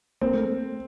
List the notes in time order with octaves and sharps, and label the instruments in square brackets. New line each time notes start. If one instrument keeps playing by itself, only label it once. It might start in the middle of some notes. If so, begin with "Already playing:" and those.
[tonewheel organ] A#3 [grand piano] C4
[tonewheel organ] A3